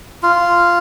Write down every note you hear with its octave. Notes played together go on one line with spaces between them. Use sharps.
F4